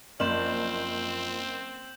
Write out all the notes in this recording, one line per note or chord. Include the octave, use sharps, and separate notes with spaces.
F#1 F3 C4 D5 G6 E7 F#7